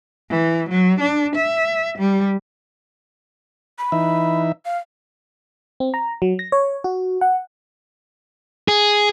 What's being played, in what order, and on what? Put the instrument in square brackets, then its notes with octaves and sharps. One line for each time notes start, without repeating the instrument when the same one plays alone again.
[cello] E3
F#3
D4
E5
G3
[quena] B5
[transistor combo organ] E3 D#4 E5
[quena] F5
[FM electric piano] C4
A#5
F#3
A#6
C#5
F#4
F#5
[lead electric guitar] G#4